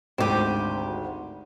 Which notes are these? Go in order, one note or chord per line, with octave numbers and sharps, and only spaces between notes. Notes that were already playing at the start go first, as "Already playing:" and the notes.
G#1 D2 C4 G4 D#7